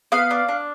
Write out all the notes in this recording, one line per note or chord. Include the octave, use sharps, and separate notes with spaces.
B3 F5
D4
D4